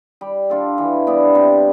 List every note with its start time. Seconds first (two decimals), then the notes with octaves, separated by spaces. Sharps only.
0.21 G3
0.50 D4 F4 A4
0.78 E3
1.07 G3 B3 D4
1.35 C3